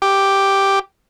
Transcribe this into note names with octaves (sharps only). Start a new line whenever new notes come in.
G4